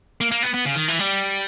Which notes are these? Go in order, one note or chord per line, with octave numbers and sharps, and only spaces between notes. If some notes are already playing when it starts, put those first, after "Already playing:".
A#3
A#3
B3
B3
C#3
D#3
E3
G3